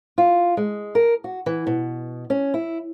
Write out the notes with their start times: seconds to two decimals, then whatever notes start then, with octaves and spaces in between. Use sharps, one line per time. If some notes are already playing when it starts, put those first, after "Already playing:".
0.18 F4
0.57 G#3
0.95 A#4
1.24 F#4
1.46 E3
1.67 B2
2.30 C#4
2.54 E4